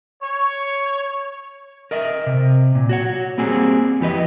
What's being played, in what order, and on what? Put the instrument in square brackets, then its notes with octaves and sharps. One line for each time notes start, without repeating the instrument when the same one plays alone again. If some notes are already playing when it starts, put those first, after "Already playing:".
[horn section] C#5
[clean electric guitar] A#4 D#5 E5
C3
A#2
F#4 C#5 F#5
G3 A#3 C4 F#4 G#4
F2 E3 G4 B4 D#5